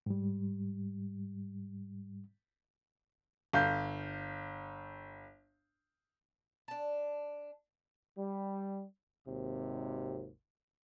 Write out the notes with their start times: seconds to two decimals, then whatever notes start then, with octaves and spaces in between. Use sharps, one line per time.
0.06 G#2 G3
3.53 G1 F5 G6
6.68 D4 A5
8.18 G3
9.27 G#1 D#2 C3